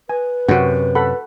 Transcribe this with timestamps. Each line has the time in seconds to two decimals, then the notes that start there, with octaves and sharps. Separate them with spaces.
0.09 B4 G#5
0.48 F#2 C3 F#4 F#5
0.95 A4 F#5 B5